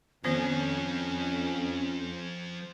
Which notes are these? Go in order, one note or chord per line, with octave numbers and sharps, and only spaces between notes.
F2 D#3 F3 B3 C#4 A4 C5